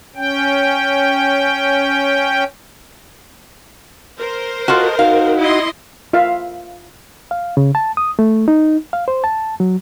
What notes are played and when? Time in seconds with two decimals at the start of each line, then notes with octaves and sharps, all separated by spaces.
0.15 C#4 G5
4.19 A#4 C5
4.68 F4 F#4 A4 D#5
4.99 D#4 F#4 F5
5.39 E4 D#5 C6
6.13 F4 E5 F5
7.31 F5
7.57 C#3
7.75 A5
7.97 D#6
8.19 A3
8.48 D#4
8.93 F5
9.08 C5
9.24 A5
9.60 F#3